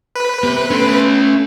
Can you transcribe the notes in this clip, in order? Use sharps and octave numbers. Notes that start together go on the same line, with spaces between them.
B4
B3 G4 C5
A3 C#4 C6